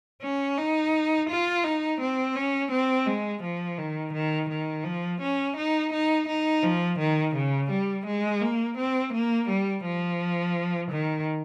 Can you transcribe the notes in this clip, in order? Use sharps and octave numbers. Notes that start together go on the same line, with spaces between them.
C#4
D#4
F4
D#4
C4
C#4
C4
G#3
F3
D#3
D#3
D#3
F3
C#4
D#4
D#4
D#4
F3
D#3
C#3
G3
G#3
A#3
C4
A#3
G3
F3
D#3